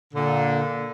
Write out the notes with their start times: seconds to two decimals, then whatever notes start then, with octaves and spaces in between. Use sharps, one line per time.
0.14 A#2 D3